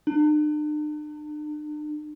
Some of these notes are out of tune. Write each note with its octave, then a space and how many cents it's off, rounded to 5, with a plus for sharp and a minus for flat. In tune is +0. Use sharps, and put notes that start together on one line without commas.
D4 +45